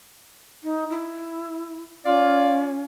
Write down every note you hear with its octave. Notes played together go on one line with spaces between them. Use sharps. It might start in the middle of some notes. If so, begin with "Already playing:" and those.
D#4
E4
C#4 F4 D5 F5